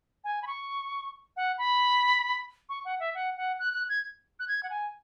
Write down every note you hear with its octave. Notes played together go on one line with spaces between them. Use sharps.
G#5
B5
C#6
F#5
B5
C#6
F#5
E5
F#5
F#5
F#6
F#6
G#6
F#6
G#6
F#5
G#5